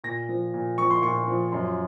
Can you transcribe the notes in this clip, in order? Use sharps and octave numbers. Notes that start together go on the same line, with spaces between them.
A#2 A#6
F3
A#2
F3 C#6
C6
A#2 C#6
F3
F#2 C6